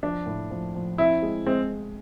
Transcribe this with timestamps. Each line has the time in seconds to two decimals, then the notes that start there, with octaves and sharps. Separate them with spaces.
0.03 F3 D4
0.26 A2
0.51 F3
0.75 F3
0.98 C4 E4
1.22 G#3
1.46 G#3 C4